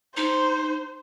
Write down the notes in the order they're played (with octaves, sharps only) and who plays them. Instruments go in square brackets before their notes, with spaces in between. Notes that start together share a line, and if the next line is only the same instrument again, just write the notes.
[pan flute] D#4 [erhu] C5